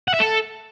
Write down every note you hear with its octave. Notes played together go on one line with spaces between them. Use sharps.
F#5
E5
A4